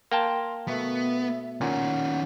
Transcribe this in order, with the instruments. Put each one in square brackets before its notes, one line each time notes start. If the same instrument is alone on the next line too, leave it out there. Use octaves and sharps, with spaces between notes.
[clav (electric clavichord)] A#3 G5 A5 [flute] C6
[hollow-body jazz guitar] B2 A3 [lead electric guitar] B3 [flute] E5
[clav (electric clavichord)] A#2 [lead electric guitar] D#3 C#4 [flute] F#5